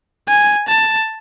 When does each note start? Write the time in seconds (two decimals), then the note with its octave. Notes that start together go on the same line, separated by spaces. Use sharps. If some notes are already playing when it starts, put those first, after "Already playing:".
0.28 G#5
0.68 A5